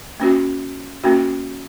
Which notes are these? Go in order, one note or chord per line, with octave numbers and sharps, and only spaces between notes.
A#3 C#4 F#4
A#3 C#4 F#4